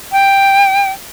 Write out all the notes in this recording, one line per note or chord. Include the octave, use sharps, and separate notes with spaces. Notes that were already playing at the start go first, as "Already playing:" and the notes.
G5